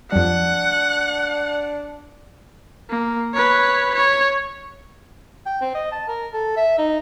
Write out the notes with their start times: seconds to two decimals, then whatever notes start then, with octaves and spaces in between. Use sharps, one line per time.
0.13 F2 G3 D4 F#5
2.90 A#3
3.34 B4 C#5
3.94 C#5
5.46 G5
5.61 C4
5.75 D#5
5.92 A5
6.08 A#4
6.33 A4
6.57 E5
6.79 D#4